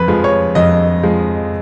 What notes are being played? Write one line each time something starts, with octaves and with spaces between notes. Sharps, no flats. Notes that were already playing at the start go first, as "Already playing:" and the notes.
Already playing: F2 B4
F3 G#3
C#5
F2 D#5
F3 G#3